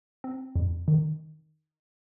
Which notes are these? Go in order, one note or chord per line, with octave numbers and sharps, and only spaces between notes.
C4
F2
D#3